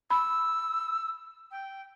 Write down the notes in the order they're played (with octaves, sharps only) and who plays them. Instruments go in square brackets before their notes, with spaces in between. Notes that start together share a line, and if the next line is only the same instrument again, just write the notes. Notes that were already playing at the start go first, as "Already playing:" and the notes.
[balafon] B5 [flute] E6
[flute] G5